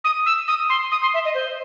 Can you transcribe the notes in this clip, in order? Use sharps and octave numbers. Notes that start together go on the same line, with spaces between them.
D#6
E6
D#6
C6
D#6
C6
E5
D#5
C5